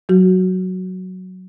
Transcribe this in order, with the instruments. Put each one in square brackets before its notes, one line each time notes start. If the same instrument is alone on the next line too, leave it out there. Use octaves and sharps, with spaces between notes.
[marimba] F#3 F#4